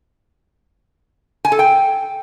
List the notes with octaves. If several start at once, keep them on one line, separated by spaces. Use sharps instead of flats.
G#5
A4
G5